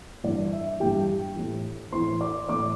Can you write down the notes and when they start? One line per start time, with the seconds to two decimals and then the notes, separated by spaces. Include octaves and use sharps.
0.24 G2 E3 D5
0.53 E5
0.80 G2 E3 G4 G5
1.36 A2 E3
1.92 A2 E3 C5 C6
2.21 D5 D6
2.48 A2 E3 D5 D6